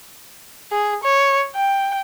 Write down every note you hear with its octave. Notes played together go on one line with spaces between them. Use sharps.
G#4
C#5
G5